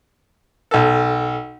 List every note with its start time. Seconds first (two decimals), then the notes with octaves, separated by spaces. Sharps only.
0.71 B1 A4